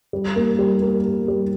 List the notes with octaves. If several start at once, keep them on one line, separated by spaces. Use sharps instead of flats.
G3
A#3
G3
A#3
A#3
G3